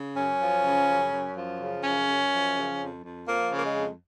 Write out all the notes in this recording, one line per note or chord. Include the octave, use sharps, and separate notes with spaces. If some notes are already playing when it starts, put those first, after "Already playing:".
Already playing: C#3
F#2 C#4
F3
C#3
F#2
F#2
F3
C#3
F#2 C#4
F#2
F3
C#3
F2
F2
F3 A#3
C#3
A#3
G#3
F2